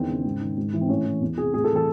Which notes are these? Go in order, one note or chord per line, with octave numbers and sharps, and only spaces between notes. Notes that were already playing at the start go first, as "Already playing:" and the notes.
Already playing: E2 D#3 C4
C#3
G#2
D#3
G#2
E3
C4
A2 C#4
E3
E2
C3 G#4
A2 G#4
A4
E3
A4